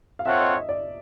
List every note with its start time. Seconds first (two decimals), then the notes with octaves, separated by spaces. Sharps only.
0.19 F5
0.26 C4 F4 A4 C#5 E5 F#5
0.40 D#5
0.55 D#5
0.69 D5